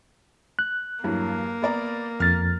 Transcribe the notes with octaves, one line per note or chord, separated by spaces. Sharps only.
F#6
E2 G2 F#3 A#3
B3 D5 A#5
F2 F6 A6